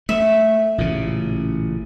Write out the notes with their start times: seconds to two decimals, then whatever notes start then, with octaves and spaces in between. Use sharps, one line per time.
0.09 A3 E5
0.78 A1 A#2 C#3